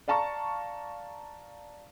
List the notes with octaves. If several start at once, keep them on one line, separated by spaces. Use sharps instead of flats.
D5 F5 A5 A#5 C#6